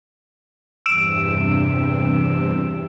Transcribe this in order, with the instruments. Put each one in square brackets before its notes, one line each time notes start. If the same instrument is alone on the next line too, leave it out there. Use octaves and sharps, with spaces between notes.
[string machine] E2 G2 C3 [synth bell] E6 D7 E7